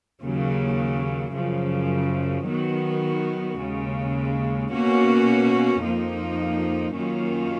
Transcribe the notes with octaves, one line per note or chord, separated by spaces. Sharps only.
D#2 C#3 F#3
F#2 C#3 F3
D#3 F#3 B3 F#4
D#2 C#3 G#3
B2 A#3 C#4 F#4
F2 F3 A#3 D#4
F#2 D#3 A#3 C#4 F4